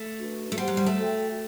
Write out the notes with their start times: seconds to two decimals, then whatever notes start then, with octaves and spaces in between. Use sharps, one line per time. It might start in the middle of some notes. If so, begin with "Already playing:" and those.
Already playing: A3
0.18 D4 F#4 B4
0.52 A3
0.57 G3 G4 C5 F#5 C6
0.68 F#3
0.77 G3
0.86 A3
0.97 F#4 A4 E5 G5